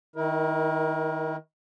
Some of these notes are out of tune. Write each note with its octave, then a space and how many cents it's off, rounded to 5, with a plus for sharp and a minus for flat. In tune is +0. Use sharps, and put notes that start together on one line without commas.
D#3 +10 E4 -25 A#4 +25